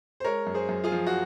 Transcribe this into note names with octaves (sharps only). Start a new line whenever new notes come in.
C5
G#3 A#4 C#5
F#2
G#4 C5
F#2
F4 G#4
F3
F#4